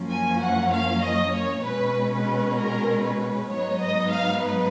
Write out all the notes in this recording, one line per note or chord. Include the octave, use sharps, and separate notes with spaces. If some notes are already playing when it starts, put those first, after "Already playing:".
Already playing: F#2 F3 A#3 C#4
G#5
F#5
F5
D#5
C#5
B2 G#3 C#4 B4
B4
A#4
B4
G#2 F#3 B3 D#4 C#5
D#5
F5
B4